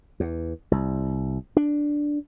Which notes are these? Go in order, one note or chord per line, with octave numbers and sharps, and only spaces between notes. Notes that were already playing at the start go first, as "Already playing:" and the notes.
E2
C2
D4